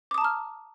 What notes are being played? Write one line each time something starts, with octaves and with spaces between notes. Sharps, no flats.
A5 A#5 D6 D#6 F6